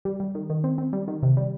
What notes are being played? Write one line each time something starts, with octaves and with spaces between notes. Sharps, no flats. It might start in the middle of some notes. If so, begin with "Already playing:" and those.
G3
G3
D#3
D#3
C4
C4
G3
D#3
C3
G3